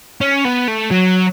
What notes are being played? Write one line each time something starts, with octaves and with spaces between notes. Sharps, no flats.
C#4
B3
A3
F#3